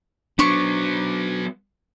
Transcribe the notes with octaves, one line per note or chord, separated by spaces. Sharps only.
F#3 B3 D4 C5 C#6 D6